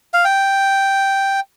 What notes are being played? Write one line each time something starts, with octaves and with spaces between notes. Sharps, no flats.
F5
G5